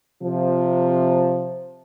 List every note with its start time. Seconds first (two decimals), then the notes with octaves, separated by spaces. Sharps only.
0.22 C3 F3